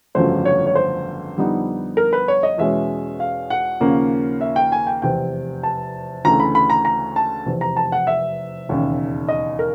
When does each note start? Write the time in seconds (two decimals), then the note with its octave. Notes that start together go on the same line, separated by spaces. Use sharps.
0.15 G1 F2 C#3 F#3 A3 C5
0.45 C#5
0.67 C#5
0.76 C5
1.37 F2 D3 G3 B3 D#4
1.97 A#4
2.13 B4
2.28 C#5
2.43 D#5
2.58 E2 B2 G#3 C#4 E5
3.20 F5
3.50 F#5
3.80 D#2 C#3 F3 A#3 C#4
4.41 E5
4.56 G5
4.72 G#5
4.87 G5
5.02 F1 E2 C3 G5
5.63 A5
6.25 D2 C#3 E3 A3 A#5
6.40 B5
6.55 B5
6.70 A#5
6.85 A#5
7.16 A5
7.46 F1 E2 C3
7.61 A#5
7.77 A5
7.92 F#5
8.07 E5
8.69 E1 D#2 C#3
9.28 D#5
9.59 A#4